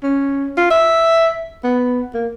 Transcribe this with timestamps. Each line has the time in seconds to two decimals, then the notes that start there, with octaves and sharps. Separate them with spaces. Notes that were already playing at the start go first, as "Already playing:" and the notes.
0.03 C#4
0.57 F4
0.70 E5
1.64 B3
2.14 A#3